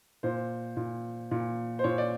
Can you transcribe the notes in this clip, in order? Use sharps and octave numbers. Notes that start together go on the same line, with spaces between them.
A#2 C5
A#2
A#2
C5
A#2 C#5
D5